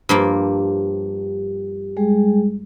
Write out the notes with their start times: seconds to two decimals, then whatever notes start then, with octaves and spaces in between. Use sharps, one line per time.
0.09 G2 F3 A#3 G4
1.97 G3 G#3 G#4